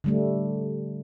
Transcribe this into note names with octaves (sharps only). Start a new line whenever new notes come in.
D3 G3 A3